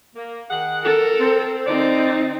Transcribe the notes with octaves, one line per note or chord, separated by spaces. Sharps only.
A#3
D#3 G#4 F#5
A4 A#4
C4
D3 C4 D#4 D5